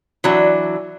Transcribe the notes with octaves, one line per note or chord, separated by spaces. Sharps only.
E3 F#3 D4